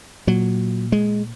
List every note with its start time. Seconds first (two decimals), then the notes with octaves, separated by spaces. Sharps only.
0.27 A#2 F#3
0.92 G#3